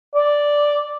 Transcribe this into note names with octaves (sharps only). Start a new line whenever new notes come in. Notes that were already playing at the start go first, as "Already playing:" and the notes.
D5